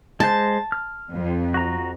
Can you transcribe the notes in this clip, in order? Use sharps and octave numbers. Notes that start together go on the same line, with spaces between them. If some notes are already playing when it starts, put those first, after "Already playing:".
G#3 C5 A5
F6
F2
F#4 A#5